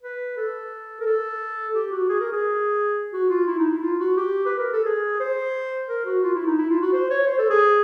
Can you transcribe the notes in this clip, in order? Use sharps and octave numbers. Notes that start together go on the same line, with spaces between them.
B4
A4
A#4
A4
G4
F#4
G#4
A#4
G#4
F#4
F4
E4
D#4
E4
F4
F#4
G4
B4
A#4
A4
G#4
C5
A#4
F#4
F4
E4
D#4
E4
F4
F#4
C5
C#5
C5
A4
G#4